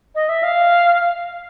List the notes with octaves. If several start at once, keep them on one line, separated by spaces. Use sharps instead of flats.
D#5
E5
F5